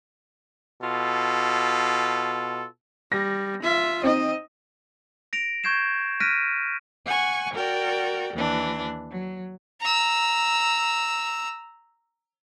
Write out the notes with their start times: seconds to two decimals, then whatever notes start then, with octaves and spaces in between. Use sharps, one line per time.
0.83 B2 F4 A4
3.12 G3 A#6
3.63 F4 E5
4.04 C4 D#4 D#5
5.33 A#6 D7 F7
5.64 C#6 G6 G#6 C7 E7
6.20 F6 F#6 A#6 B6 D7 D#7
7.06 F#5 G#5 C#6
7.54 F#4 A#4 D5 G5
8.34 D#2 E3 D4
9.11 F#3
9.81 A#5 E6